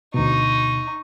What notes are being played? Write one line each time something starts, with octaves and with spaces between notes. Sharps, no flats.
D2 B2 D#4 C#6